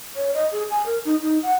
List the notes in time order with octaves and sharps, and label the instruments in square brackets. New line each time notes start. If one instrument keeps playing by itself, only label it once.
[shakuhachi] C#5
D#5
G#4
G#5
A#4
D#4
D#4
F#5